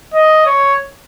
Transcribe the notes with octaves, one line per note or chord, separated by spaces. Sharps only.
D#5
C#5